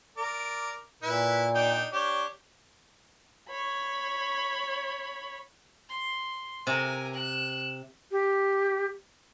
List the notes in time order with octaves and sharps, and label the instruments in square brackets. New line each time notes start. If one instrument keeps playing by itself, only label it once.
[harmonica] A#4 D5
[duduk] A#2 [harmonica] E4 B4
[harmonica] D4 D#4 G5
[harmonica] D4 G4 [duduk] C#5
[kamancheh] C#5 B5
[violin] C6
[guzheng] C3 [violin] A#4 G#5
[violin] F#6 E7
[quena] G4